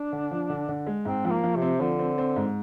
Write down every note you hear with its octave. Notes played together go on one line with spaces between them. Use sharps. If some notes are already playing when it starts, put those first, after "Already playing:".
Already playing: D4
D3
F3
D3
D3
G#3
G#2 C4
F3 C4
A#3
F3
C3
C4
D3 F3
C4
C4
G#2